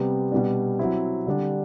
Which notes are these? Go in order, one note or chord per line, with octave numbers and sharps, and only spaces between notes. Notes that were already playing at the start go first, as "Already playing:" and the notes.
Already playing: C3 G3 B3
B2 G3 B3 D4
F#3 C4 E4
D3 G3 D4